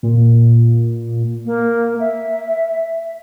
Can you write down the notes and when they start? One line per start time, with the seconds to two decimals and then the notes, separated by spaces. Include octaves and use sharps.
0.03 A#2
1.45 A#3
2.00 E5